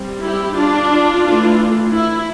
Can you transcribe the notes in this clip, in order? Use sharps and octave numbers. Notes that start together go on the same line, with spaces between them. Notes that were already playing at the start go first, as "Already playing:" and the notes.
Already playing: G3 C4
E4 G4
D4 F4
E3 A3 D4
E4